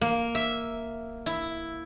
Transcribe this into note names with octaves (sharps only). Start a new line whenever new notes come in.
A#3
E5
E4